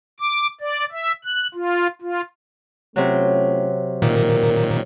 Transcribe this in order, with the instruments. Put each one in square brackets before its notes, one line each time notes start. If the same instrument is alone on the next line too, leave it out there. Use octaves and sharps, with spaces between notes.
[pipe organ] D6
D5
E5
F#6
F4
F4
[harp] C3 F#3 [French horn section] A3 C#4 F4
[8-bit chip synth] A#2 D#3 [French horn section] A#4